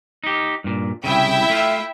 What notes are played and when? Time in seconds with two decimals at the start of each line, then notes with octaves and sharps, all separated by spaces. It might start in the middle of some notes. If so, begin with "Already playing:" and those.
0.24 D#4 G4
0.64 G2 A#2
1.04 C2 F#2 C#3 E4 E5 G5
1.50 A3 F4